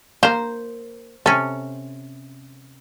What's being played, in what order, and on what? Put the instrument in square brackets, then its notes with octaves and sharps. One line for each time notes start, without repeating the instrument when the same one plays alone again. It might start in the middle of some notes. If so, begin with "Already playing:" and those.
[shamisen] A#3 A#4 [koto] C5
[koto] C3 C#4 [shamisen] A4